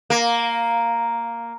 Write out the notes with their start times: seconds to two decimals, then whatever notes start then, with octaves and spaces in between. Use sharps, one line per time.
0.10 A#3